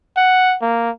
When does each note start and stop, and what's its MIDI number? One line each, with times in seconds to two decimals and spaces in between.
0.16 0.56 78
0.62 0.90 58